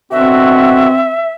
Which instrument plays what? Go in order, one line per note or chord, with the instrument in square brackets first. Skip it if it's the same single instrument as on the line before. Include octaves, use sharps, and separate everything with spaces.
[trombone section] B2 D3 F#4 [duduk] C4 [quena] E5